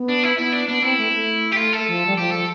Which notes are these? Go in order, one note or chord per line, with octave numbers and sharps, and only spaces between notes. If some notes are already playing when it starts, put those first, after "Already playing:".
Already playing: B3
D4
E4
B3 E4
D4
B3 D4
C4 E4
A3
A3
G4
F4
A4
F3
G3
F3 G4
A4